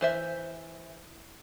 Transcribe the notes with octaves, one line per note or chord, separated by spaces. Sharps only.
E3 C5 E5